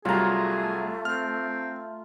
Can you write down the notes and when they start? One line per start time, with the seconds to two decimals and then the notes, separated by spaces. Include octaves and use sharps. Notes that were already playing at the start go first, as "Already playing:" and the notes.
0.05 C2 F#3 G3 A3 F4 G#4 A#5
1.05 C4 F6